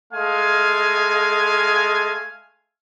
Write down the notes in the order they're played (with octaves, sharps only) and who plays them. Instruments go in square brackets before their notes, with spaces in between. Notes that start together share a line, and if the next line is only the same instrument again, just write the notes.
[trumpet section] G#3 A3 F5 G#5